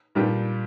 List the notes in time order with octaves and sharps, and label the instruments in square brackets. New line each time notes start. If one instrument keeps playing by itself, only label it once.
[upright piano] A#2 G3 D4 G4